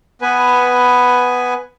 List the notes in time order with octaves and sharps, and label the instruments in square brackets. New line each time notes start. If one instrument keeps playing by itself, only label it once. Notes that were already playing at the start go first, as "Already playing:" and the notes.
[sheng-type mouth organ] B3 B4 G#5